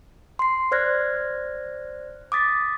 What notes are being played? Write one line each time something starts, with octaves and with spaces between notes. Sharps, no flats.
C6 C7
C5 D5 F6 F#6 G#6 A#6
D6 D#6 A6 B6